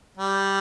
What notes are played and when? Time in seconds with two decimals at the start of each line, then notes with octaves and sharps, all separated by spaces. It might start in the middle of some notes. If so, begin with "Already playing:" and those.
0.18 G3